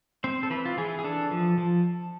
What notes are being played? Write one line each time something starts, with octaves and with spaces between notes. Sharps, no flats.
C4 C5
A4
E3 B4
F4
E3 G#4
G#4
D4 A4
F3
F3